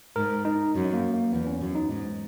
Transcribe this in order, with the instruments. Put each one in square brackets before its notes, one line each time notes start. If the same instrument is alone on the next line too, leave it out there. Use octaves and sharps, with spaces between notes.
[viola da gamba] G#2 [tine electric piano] A#4
[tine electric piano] D#4
[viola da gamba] F#2
[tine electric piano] A#3
A#3
[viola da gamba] E2 [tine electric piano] B3
[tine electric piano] C#4
[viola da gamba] F#2
[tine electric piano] D#4
[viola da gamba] G#2